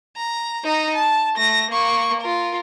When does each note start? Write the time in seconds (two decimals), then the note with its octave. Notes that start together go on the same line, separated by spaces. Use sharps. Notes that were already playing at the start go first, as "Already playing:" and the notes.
0.16 A#5
0.64 D#4 A#5
0.95 A5
1.36 A3 A#6
1.70 A#3 C#6
2.21 F4 A#4